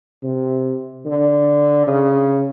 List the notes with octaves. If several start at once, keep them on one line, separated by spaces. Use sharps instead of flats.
C3
D3
C#3